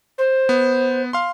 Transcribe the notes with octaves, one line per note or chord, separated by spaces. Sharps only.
C5
B3
F5 C6